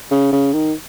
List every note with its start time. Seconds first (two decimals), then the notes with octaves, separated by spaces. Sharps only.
0.11 C#3
0.32 C#3
0.53 D#3